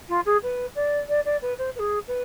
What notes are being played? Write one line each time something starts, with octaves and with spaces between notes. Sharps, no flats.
F4
G#4
B4
D5
D5
D5
B4
C5
B4
G#4
B4